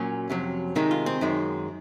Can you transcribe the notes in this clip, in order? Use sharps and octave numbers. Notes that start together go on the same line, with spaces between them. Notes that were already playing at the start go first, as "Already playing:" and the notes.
Already playing: A#2 F#3 C#4
F2 C3 F#3
C3 D#3 G#3 D#4
F4
C4
F#2 D#3 G#3